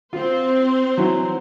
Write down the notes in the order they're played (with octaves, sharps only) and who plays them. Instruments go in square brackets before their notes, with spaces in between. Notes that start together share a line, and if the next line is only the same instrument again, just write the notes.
[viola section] C4 C5 [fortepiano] F4
[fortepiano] E3 F#3